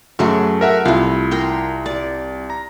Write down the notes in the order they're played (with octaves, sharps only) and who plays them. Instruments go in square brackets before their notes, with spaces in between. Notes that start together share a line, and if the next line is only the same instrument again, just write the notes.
[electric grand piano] F#2 [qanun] F#3 A3 G#4
[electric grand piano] A#4 E5 F#5
[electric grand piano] C2 [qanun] E4 F4
[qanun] A#4 G5 C6
D5
[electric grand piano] A#5